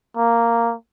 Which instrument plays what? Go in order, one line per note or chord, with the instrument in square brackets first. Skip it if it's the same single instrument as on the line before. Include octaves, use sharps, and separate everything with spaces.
[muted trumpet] A#3